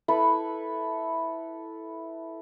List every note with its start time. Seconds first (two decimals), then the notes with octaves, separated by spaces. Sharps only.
0.08 E4 A4 B4